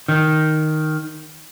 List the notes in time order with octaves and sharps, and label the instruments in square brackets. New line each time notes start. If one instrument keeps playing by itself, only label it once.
[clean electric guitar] D#3